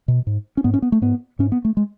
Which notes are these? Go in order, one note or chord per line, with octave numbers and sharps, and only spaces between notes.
B2
G#2
C#4
G#2 B3
C#4
B3
A3
G#2 B3
G#2 C#4
B3
A3
G#3